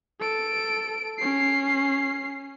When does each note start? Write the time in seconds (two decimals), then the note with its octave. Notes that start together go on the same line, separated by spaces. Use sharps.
0.20 A4 D7
1.19 C#4 C7